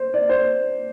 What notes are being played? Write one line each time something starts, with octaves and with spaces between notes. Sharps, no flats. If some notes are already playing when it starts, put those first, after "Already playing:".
Already playing: C5
D5
C5